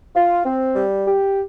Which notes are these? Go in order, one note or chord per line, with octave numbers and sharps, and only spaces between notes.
F4
C4
G3
G4